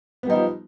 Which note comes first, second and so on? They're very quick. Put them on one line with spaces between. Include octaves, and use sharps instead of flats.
B3 G3 D#4 F3